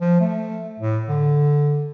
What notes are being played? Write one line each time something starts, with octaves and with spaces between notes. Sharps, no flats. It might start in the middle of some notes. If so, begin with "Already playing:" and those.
F3
A3
A2
D3